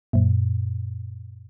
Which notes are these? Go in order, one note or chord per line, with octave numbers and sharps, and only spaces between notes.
F#2 A#2